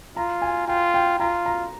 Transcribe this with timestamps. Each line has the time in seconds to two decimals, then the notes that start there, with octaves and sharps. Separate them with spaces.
0.16 F4 A#5
0.42 G#5
0.68 F4 G5
0.94 G5
1.19 F4 A#5
1.46 A#5